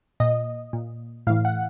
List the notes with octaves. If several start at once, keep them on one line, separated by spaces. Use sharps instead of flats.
A#2 D#5
A#2
A2 E3 F5
F#5